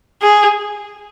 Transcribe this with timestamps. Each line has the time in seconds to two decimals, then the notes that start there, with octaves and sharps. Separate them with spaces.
0.22 G#4